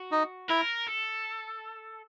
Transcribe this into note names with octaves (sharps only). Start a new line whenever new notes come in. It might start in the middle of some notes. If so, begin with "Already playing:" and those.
Already playing: F#4
D#4
E4 A#4
A4